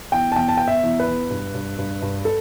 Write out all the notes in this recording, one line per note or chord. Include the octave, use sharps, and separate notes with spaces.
E2 G5
A5
E2 G5
A5
B3 G5
E5
E2
B4
E2
G2
G2
G2
G2
A4